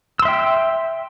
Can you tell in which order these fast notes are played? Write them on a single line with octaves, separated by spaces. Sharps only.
E6 C6 E5 G5